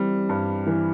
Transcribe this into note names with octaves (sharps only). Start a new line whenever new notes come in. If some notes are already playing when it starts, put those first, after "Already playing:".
Already playing: E3 G3 C4
G2
E3